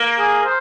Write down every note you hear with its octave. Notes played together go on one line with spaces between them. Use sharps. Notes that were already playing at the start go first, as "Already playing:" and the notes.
Already playing: A#3
G#4
C5